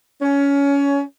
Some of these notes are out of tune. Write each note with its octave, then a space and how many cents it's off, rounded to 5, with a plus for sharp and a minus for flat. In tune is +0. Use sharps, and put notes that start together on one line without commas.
C#4 +20